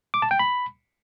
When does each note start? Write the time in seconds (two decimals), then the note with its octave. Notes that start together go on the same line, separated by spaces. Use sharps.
0.14 D6
0.22 A5
0.31 G5
0.39 B5